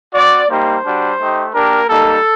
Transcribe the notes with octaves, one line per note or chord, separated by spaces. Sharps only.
C4 F#4 D5
G3 A#3 D#4 G4 C5
G3 D4 F#4
A3 D#4 G4
A#3 D4 G4 A#4
G3 A#3 D#4 A4